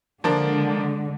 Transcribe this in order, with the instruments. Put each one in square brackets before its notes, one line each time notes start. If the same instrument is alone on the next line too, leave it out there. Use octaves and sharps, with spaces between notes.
[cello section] D3 G#3 [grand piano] F3 A#3 D4